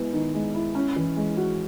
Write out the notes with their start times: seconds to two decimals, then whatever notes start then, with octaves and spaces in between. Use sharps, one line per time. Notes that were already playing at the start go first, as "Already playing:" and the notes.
Already playing: G#3 B3 E4
0.13 D#3
0.34 G#3
0.54 E4
0.75 C#4
0.96 E3
1.16 G#3
1.37 F#4